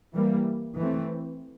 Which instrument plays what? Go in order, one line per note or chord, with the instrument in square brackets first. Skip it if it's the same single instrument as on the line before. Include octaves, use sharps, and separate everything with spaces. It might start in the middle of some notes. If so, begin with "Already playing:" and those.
[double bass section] E3 G3 A#3
E3 A3 C4